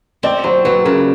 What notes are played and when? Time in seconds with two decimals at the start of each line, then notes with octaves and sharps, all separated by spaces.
0.23 C4 D5
0.44 F#3 C5
0.65 F#3 B4
0.85 C#3 A#4